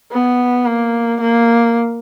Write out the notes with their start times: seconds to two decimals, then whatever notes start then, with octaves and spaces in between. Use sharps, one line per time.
0.12 B3
0.66 A#3
1.21 A#3